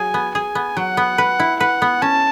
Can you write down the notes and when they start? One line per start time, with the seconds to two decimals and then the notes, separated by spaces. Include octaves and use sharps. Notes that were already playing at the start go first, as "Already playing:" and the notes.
Already playing: F#3 G#4 G#5
0.14 B3
0.35 G#4 G#5
0.55 B3
0.77 F#3 F#5
0.97 B3
1.18 B4
1.40 E4
1.60 B4 F#5
1.82 B3
2.02 C#4 A5